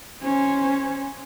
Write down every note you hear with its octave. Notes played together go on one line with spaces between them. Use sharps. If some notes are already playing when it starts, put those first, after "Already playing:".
C#4 C5